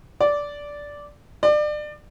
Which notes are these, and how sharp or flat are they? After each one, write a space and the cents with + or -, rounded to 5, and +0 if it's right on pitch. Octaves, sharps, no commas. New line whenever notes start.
D5 -10
D5 +30